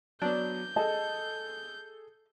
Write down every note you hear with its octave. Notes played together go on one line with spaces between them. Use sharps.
F#3 B3 D4 G6
G#4 A4 D#5 A5